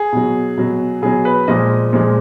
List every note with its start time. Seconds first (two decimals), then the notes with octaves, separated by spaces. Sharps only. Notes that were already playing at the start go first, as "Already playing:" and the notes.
Already playing: G#4
0.13 B2 F#3
0.57 B2 F#3
1.02 B2 F#3 G#4
1.25 B4
1.48 A#2 F3 G#3 D#5
1.93 A#2 F3 G#3